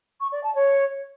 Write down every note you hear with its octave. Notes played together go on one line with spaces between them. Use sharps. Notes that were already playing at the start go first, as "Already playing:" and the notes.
C#6
D5
A5
C#5